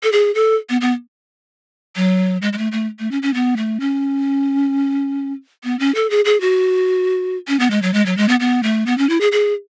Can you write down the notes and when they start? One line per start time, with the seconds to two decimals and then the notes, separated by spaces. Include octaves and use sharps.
0.03 A4
0.12 G#4
0.35 A4
0.69 B3
0.81 B3
1.96 F#3
2.42 G#3
2.53 G#3
2.58 A3
2.72 A3
2.99 A3
3.11 C#4
3.22 C#4
3.34 B3
3.57 A3
3.80 C#4
5.64 B3
5.79 C#4
5.95 A4
6.10 G#4
6.25 G#4
6.41 F#4
7.48 C#4
7.60 B3
7.71 G#3
7.82 F#3
7.94 G#3
8.06 F#3
8.17 G#3
8.29 B3
8.40 B3
8.63 A3
8.86 B3
8.98 C#4
9.09 E4
9.21 G#4
9.32 G#4